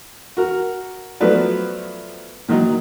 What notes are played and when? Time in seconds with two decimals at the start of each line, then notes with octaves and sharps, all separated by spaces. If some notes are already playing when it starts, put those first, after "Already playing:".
0.37 F#4 A#4
1.21 F3 F#3 A3 B3 B4 D5
2.48 A#2 D#3 F#3 D#4